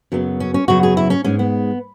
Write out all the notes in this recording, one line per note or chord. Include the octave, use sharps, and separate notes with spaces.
F#2 C#3 F#3 B3
C#4
C#4
F#2 C#3 F#3 B3 F#4
G#4
E4
C#4
G#2 G#3 B3 C#4
B3